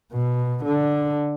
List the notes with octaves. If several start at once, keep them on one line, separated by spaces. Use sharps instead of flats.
B2
D3